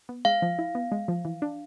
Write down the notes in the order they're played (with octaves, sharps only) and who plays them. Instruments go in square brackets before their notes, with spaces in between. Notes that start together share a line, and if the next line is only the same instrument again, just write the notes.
[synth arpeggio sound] B3
[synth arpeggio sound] G#3 [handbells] F5
[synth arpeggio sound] F3
E4
B3
G#3
F3
E3
D4